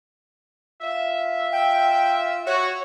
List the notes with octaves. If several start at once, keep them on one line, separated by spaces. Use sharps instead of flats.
F4 E5
G5
F#4 C#5